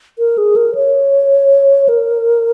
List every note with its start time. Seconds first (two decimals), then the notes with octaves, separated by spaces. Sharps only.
0.19 A#4
0.38 G#4
0.56 A#4
0.75 C#5
1.89 A#4